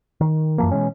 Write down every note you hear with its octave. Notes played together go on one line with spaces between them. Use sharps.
D#3
F#2 E3 F3 A#3
B2 E3 G#3 C#4